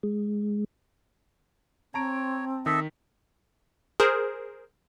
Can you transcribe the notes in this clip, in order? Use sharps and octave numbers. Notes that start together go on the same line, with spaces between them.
G#3
C4 C#5 A5 A#5 D7
D#3 A4 D#5 E5 B6
G#4 A#4 C5